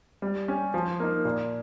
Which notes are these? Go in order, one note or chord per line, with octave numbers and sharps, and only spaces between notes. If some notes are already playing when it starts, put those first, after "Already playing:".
G3
C#4 G4
F3
A#3 D#4
A#2